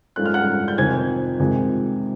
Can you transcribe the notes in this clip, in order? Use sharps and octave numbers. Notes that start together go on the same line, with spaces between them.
G#2 F3 A3 C#4 F#6
F6
F#5 F#6
G6
F2 C3 D#3 G#5 G#6
C#2 C3 D#3 G#3